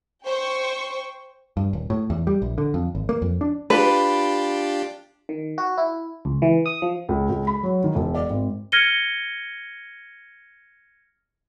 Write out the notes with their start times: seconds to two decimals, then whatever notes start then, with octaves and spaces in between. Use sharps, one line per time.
0.25 C5 G5 C#6
1.57 G2
1.73 D#1
1.90 A2
2.10 E2
2.27 G3
2.42 A#1
2.58 D3
2.74 F2
2.95 G#1
3.09 A#3
3.22 F2
3.41 D4
3.70 D4 F4 G4 B4
5.29 D#3
5.58 F#4
5.78 E4
6.25 C#2
6.42 E3
6.66 D#6
6.82 F3
7.09 C#2
7.29 C#2
7.47 B5
7.63 F#3
7.84 D#3
7.95 E1
8.15 D5
8.30 G#1
8.72 F6 G#6 A#6 C#7 D#7 G7